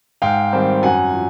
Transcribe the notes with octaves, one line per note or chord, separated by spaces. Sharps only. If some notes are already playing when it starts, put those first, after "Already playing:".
G#2 F5 G5
D#3 G3 C4
F#2 F#5 G#5
F3